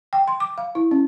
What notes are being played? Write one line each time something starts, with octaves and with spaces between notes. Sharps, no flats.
G5
C6
D6
F5
E4
C#4